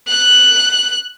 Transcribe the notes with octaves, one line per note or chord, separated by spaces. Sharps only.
F#6